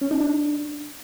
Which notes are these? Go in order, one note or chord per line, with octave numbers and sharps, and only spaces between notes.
C#4
D#4
D4